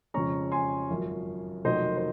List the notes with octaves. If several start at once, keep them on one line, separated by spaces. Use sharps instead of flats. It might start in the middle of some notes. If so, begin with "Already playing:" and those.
F2 C#3 G#3 C#4 A#5 C#6
G#5 C6
G#1 F#2 F3
F1 F2 D#3 F#3 A#3 C5 D#5
C5